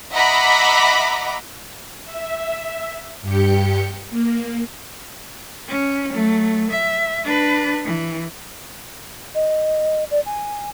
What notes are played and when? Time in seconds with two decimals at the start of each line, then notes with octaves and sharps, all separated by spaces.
0.12 D#5 E5 F#5 A#5 B5 D6
2.05 E5
3.22 G2 G4 G5 C#7
4.10 A#3
5.68 C#4
6.12 F#3 A3
6.71 E5
7.25 D4 B4
7.85 E3
9.34 D#5
10.10 D5
10.25 G#5